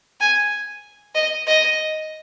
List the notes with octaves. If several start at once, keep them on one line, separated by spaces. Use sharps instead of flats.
G#5
D#5
D#5